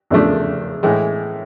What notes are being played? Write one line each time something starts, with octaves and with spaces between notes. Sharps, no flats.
E2 C#3 F3 A3 D4
A2 E3 G#3